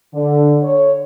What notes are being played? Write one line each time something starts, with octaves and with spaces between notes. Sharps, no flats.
D3
C#5